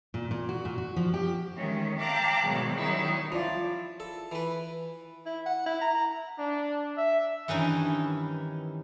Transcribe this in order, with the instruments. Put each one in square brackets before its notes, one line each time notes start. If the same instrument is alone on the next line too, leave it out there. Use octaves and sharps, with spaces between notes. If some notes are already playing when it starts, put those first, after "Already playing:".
[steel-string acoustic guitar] A#2
A#2
F#4
A#2
F#4
F3
G4
[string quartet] D#3 G#3 A3 C#4
F5 G5 A5 A#5 D6 F#6
G#2 B2 D#3 F#3 G3
D#3 F#3 G3 C#4 D#4 E4
[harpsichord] F3 [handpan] E4 F4 D5
[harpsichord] A4
E3 B4
[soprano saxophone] E4
F#5
E4
A#5
A#5
[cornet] D4
E5
[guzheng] G2 D#3 E3 C#4 D#4 E4